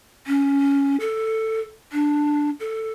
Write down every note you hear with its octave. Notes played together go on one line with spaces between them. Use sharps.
C#4
A4
D4
A4